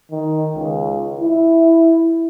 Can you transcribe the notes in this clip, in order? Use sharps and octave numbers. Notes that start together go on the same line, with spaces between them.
D#3
C#2
E4